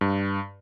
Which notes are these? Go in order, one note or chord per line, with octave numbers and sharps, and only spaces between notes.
G2